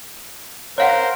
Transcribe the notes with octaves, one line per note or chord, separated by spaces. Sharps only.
A#4 C5 C#5 F5 F#5